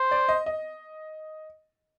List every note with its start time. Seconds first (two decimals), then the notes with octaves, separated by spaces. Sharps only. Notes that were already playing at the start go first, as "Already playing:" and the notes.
Already playing: C5
0.11 D5
0.29 D#5
0.46 D#5